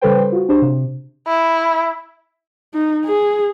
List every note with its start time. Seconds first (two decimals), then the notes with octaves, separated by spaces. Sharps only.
0.01 C#3 G3 A4 B4 C5 G5
0.32 F4 F#4
0.49 D4 G4 C5
0.62 C3
1.27 E4
2.74 D#4
3.06 G#4